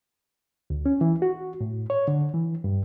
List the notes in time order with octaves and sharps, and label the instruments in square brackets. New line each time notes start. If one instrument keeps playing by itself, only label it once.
[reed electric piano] D2
C#4
E3
F#4
A2
C#5
D3
E3
G2